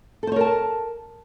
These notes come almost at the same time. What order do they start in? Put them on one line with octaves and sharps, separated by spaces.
A4 C5 C#5 A#4 A5